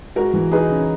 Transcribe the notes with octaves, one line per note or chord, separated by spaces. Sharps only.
G#3 F#4 A#4
E3
D#4 G#4 B4
C#3